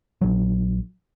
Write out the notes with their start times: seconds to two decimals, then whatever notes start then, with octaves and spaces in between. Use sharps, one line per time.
0.21 A#1 F#3